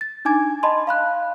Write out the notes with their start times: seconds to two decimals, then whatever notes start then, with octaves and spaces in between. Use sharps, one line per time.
0.01 A6
0.25 D4 D#4 G#5 D6 G#6
0.63 D#5 A5 B5 C6
0.87 F5 B5 F#6